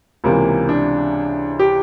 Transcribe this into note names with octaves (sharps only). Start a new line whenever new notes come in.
C#2 C3 E3 A#3
D4
G4